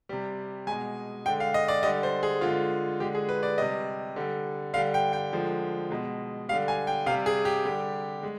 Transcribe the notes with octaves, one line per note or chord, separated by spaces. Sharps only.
C3 G3
B2 G#3 G#5
D3 G#3 G5
F5
D#5
D5
D3 G3 D#5
C5
G#4
D3 G#3 F4
D3 G#3 G4
G#4
B4
D5
C3 G3 D#5
D3 G3
D3 G3 F5
G5
G5
D3 F3 G#3
B2 G#3
D3 G3 F5
G#5
G5
C3 G3 F5
G#4
G4
D3 G3
G#3